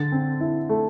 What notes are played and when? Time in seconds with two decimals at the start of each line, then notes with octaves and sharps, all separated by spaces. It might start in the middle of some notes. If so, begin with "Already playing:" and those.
Already playing: D3 A6
0.12 C4
0.40 E4
0.69 A3